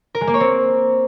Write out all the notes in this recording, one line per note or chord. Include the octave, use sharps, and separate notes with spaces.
A#4
G#3
A#3
C#5
C4